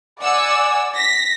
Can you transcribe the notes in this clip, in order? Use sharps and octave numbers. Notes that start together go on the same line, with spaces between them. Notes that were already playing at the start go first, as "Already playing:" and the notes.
D5 F#5 G#5 E6
A#6 B6